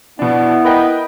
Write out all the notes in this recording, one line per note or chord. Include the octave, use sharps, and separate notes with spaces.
B2 B3 D4 E4
A#4 B4 D#5 G5